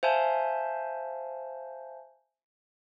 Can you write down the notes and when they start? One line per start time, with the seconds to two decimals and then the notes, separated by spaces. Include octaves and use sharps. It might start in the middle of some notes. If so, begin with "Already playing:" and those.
0.03 C5 E5 F5 G#5 A5 G6